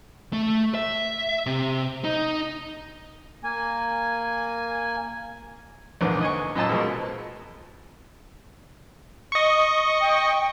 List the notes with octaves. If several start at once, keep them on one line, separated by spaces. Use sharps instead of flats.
A3
E5
C3
D#4
A#3 G#5
A#1 E2 G#2 D3 B3 D6
D#5 G#5 C#6
F#2 A#2 D#5 A5 E6
B2 F3 G#3 A#4
D#5 C#6
G5